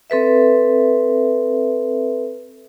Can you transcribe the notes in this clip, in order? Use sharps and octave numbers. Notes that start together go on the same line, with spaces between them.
C4 A4 B4 E5